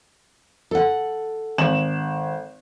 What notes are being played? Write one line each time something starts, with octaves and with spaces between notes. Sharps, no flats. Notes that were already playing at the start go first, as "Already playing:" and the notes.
A4 F#5
G#1 E7 F#7